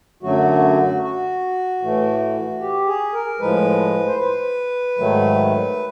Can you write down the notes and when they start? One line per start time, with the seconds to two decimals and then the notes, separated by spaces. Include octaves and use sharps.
0.23 F#2 D3 F#3 A3 F#4
1.02 F#4
1.82 A2 E3 A3
2.61 G4
2.87 G#4
3.13 A#4
3.40 A2 F3 G#3 B4
4.07 C5
4.19 B4
4.98 G#2 D#3 F#3 A3